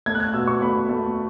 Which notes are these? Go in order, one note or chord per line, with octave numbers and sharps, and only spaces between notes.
A3 G#6
F#6
G#6
B2 E6
C#6
A3 B5
A3